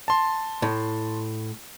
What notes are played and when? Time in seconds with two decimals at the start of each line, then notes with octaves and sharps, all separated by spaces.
0.08 A5 C6
0.62 A2